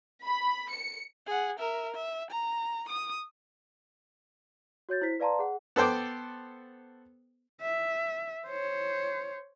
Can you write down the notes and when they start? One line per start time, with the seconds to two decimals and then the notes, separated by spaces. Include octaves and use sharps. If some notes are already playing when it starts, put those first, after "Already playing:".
0.24 B5
0.71 C#7
1.27 G#4 F#5
1.59 A#4 E5
1.94 E5
2.31 A#5
2.89 D#6
4.89 F#4 C#5 G6 A6
5.01 E4 C5 B6
5.20 B4 D5 F5 A5 A#5 C6
5.39 G#4 F#5
5.76 B3 A4 C5 G5 D6
7.62 E5
8.47 C5 C#5